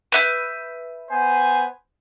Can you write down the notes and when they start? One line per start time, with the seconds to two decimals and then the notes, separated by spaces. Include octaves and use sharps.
0.12 B4 E5 G6
1.10 B3 C5 G#5